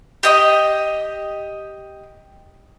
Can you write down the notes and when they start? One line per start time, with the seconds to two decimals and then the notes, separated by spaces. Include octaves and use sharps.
0.23 G4 D#5 D#6